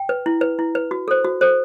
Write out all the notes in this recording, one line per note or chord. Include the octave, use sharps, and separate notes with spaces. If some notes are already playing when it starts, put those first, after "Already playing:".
Already playing: G5
B4
E4
B4
E4
B4
F#4
A4 C5
F#4
A4 C5